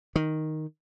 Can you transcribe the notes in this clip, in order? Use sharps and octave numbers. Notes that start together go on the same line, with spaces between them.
D#3